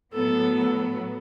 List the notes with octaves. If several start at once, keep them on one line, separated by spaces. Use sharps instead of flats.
A2 F#3 B3 A4